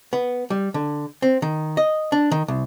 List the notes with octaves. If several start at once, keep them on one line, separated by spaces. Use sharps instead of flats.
B3
G3
D3
C4
D#3
D#5
D4
D#3
C2